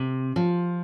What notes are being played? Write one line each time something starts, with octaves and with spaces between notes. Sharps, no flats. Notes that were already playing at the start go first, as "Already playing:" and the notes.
Already playing: C3
F3